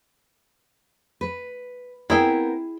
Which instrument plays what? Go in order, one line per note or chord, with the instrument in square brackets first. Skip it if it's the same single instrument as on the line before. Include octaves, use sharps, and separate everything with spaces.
[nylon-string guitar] B4
[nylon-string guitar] B3 C4 A#4 [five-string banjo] E4 G#4 G5